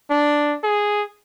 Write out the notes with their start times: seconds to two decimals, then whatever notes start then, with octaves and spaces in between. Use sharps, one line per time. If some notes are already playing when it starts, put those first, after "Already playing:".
0.10 D4
0.64 G#4